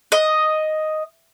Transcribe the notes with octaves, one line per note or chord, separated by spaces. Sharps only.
D#5